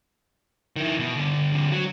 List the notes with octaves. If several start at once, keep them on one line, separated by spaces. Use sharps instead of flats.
D#3 E4
B2
G2 D3
D3 C4
F#3